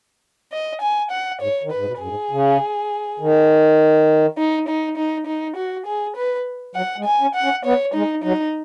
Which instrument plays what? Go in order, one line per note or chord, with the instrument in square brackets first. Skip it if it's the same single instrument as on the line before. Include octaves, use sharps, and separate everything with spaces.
[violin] D#5
G#5
F#5
[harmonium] G#2 [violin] C#5
[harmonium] D#3
[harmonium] G#2 [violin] B4
[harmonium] B2
[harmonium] F#2 [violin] G#4
[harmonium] G#2
C#3
D#3
[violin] D#4
D#4
D#4
D#4
F#4
G#4
B4
[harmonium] F#3 [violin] F#5
[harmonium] G#3
[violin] G#5
[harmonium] C#4
[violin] F#5
[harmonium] C#4
[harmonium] B3 [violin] C#5
[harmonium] G#3 [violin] D#4
[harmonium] F#3 [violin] D#4